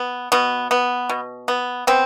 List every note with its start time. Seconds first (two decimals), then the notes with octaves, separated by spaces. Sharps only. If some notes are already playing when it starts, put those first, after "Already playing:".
Already playing: B3
0.32 B2 B3
0.71 B3
1.09 B2
1.48 B3
1.87 B3 C4